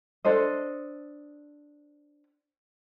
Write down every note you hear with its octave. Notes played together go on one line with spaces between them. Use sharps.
D4 A4 C5 D#5